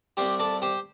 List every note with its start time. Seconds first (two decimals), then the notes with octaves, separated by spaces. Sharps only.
0.17 C2 C3 G3 G4 C5
0.40 A4 D5
0.62 G4 C5